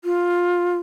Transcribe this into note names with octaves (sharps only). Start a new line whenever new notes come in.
F4